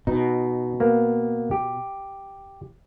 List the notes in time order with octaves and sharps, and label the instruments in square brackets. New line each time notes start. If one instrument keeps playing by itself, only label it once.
[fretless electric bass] B2 [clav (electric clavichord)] D#4
[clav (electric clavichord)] A#3 B3
G4